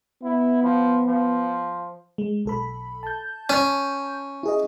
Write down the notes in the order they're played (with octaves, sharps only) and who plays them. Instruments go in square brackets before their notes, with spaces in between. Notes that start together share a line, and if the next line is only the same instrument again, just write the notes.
[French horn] B3 [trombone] E4
[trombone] F3
F3
[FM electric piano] G#3
B1 A4 B5
A5 G6
[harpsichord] C#4
[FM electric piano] E4 G#4 D#5